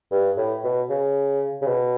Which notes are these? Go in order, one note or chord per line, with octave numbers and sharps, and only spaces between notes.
G2
A2
B2
C#3
C#3
B2